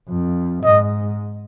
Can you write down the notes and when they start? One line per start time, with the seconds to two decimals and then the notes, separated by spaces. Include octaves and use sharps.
0.09 F2
0.64 G#2 D#5